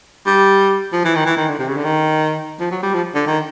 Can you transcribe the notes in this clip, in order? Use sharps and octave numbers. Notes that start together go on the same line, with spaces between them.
G3
F3
E3
D#3
E3
D#3
D3
C3
C#3
D3
D#3
F3
F#3
G3
F3
D3
D#3